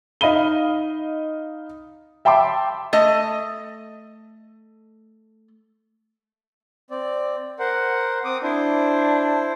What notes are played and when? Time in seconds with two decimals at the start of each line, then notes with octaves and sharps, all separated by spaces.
0.21 D#4 D#5 F5 B5 D#7 G7
2.25 E5 G5 A5 B5 C6 D6
2.93 A3 D#5
6.90 C4 D5
7.59 A#4 C5 F#5
8.25 C4 D6 D#6
8.43 D4 E4 C5